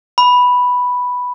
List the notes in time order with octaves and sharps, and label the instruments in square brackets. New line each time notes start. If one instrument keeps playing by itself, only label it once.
[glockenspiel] B5